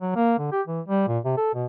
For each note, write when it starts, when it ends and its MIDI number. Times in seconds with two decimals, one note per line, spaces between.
0.02 0.13 54
0.16 0.38 58
0.39 0.49 50
0.52 0.61 67
0.67 0.81 52
0.88 1.07 55
1.08 1.19 46
1.25 1.33 48
1.37 1.52 69
1.55 1.66 47